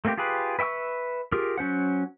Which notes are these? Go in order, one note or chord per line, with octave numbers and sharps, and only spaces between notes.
A3 A#3 C4 F#4 G4
F4 G4 G#4 B4
B4 E5 G5 C#6 E6
F4 G4 G#4 A#4
F#3 C#4 C5 F#5